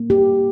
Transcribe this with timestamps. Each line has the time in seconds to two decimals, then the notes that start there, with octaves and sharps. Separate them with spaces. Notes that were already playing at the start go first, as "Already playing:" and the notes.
Already playing: A#3
0.10 G4